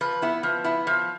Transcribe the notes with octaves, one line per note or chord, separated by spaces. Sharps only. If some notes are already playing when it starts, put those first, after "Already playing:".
F3 B4
B3 E4
F3
B3 E4
F3